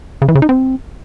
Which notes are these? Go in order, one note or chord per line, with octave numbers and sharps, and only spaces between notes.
C#3
E3
C#3
D#4
C4